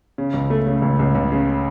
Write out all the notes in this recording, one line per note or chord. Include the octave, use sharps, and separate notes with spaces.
C#3
C#2
A3
C#3
C#2
C#2
C#2
C#3